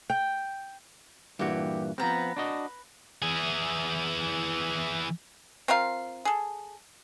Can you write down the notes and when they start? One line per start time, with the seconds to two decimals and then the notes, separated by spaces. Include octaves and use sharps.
0.10 G5
1.39 G2 A#2 E3 F#4 G4
1.98 F3 B3 C4 B4 A#5
2.37 D4 F#4 D#5
3.22 E3 G#4
5.68 C4 F4 A#4 F5
6.25 G#4 A4